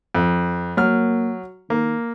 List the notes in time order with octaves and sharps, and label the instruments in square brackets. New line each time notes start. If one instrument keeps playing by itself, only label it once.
[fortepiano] F2
[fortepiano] F#3 F6 [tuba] A#3
[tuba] D#3 [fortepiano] A#3